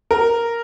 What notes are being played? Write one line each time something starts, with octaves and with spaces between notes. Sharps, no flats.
A#4